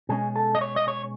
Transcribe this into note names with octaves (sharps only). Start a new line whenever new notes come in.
B2 G#3 C#4 G#4
A4
D#5
C#5
D#5
C#5